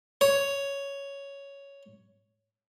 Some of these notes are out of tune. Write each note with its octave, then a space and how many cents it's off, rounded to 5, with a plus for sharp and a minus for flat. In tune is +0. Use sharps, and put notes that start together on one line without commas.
C#5 +5